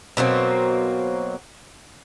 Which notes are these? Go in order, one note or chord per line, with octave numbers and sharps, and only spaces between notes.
B2 F#3 A#3 C4